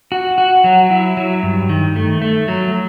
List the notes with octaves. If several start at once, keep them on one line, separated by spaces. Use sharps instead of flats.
F#4
F#4
F#3
E4
F#3
G2
D#3
A3
A3
F#3